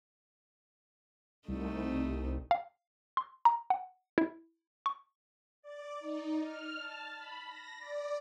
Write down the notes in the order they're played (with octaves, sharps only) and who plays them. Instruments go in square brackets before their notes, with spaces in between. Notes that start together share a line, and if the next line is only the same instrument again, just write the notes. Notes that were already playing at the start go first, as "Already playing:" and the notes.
[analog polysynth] C2 [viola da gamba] A3 D#4
[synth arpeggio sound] F5
C6
A#5
F#5
E4
C#6
[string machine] D5
D#4
F6
A5
B5
A#6
D5